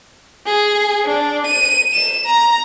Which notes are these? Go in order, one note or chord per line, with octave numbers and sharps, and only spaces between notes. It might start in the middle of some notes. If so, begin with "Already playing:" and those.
G#4
D4
D#7
E7
A#5